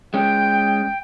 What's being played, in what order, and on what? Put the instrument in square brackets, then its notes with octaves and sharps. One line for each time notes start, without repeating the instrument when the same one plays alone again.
[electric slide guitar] G#3 C#4 [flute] G5